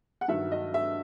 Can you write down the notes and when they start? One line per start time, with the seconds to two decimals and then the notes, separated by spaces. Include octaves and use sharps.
0.21 F#5
0.28 G2 D#3 F#3 E5
0.52 D#5
0.74 E5